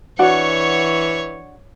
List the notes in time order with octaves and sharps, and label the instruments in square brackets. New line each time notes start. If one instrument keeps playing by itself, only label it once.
[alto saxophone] E3 [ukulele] D4 F#4 F#5 [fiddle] C#5 C#6